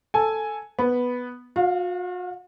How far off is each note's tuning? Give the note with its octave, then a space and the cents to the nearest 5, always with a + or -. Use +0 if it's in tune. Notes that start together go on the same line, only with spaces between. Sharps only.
A4 +0 G#5 +5
B3 +0 B5 +0
F#4 -45 F5 +0